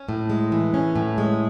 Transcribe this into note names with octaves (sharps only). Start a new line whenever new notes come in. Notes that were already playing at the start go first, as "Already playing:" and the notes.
Already playing: C#4
A2
G#3
E3
C#4
A2
G#3